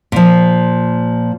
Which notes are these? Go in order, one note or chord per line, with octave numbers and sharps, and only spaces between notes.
A#2 F3